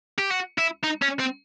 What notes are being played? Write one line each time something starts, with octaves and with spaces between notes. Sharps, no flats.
G4
F#4
E4
D#4
C#4
C4